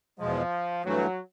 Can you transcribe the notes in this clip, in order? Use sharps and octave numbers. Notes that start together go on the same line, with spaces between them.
E2 B2 F3 G#3
G2 E3 F#3 A3